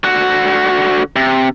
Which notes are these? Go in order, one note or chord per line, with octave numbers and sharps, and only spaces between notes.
D3 F#4
C3